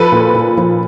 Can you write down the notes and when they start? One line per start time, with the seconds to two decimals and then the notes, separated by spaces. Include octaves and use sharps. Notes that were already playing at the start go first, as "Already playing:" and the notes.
Already playing: F3 A4 B4
0.12 A#2
0.34 A#2
0.57 F3